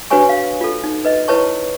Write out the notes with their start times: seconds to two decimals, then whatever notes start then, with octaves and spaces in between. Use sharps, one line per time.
0.10 D4 F#4 B4 C#5 G#5 C#6
0.29 F5
0.61 F4 A4
0.84 D#4
1.05 B4 D#5
1.28 E4 B4 C#5 A5 C#6